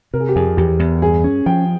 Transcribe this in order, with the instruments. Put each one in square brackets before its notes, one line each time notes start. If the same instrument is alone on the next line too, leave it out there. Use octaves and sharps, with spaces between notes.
[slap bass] C3 [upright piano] A#4
[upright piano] G#4
G4
[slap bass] F2 [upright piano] G#4
[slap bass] E2 [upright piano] G4
[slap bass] E2
[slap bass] G2 [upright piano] G#4
[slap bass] C#4
[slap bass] F3 [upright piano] G5